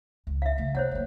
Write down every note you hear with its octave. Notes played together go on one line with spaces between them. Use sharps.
C#2
E5 F5
C#3 A3
C2 C5 C#5 F#5
F#3 A#3